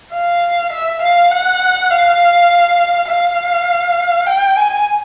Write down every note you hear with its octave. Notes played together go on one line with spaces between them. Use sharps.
F5
E5
F5
F#5
F5
F5
G5
G#5